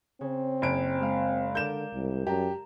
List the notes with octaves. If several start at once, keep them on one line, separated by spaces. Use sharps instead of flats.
C#3 C4
F#1 G#5 D7
G#3 F5
D3 A#4 D5 G6 E7
C2 G3
F#2 G4 A5 A#5